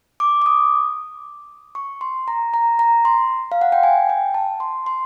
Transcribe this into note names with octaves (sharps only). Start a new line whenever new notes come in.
D6
D6
D#6
C#6
C6
A#5
A#5
A#5
C6
F5
F#5
G5
G#5
G5
A5
C6
C6